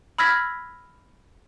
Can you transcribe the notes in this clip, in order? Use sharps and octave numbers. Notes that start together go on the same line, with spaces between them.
B5 E6 F6 G#6 A#6 B6